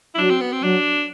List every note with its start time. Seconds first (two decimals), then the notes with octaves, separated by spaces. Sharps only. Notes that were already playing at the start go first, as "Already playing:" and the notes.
0.15 E4
0.18 F#3 D4
0.30 C4
0.41 B3
0.52 C4
0.63 F#3 D4